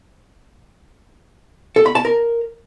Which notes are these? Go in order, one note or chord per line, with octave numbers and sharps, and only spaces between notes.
A4
B5
A5
A#4